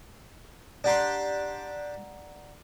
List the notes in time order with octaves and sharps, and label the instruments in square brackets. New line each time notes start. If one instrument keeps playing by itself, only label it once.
[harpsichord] D4 G4 C6 [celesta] D5 F#5 A#5